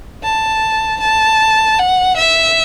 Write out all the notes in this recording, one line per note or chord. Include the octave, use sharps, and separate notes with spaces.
A5
A5
F#5
E5